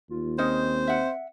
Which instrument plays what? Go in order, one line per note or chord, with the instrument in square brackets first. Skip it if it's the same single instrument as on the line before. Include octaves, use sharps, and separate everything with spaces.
[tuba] D#2 [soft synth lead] F4
[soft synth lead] C4 [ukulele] C#4 D#4 D#5 [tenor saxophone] C5
[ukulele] E5 F#5